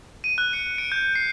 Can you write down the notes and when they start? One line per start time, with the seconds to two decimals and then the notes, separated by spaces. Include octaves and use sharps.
0.24 D#7
0.38 F#6
0.53 C#7
0.78 D7
0.92 G6
1.15 C7